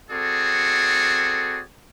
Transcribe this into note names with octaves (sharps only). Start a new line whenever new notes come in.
C4 F#4 G#4 A4 D5